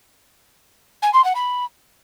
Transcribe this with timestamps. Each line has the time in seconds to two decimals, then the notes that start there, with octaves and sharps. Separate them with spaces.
1.02 G#5
1.13 C6
1.24 F#5
1.35 B5